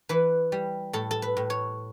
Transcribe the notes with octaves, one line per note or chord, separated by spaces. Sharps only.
E3 B4
G3
A2 A4
A4
B4
A2
C#5